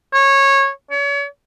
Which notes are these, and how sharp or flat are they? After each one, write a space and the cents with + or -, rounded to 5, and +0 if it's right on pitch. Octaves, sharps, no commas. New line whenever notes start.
C#5 -15
C#5 +40